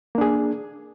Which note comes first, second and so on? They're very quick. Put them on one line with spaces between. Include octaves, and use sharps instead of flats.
A#3 D4 G#4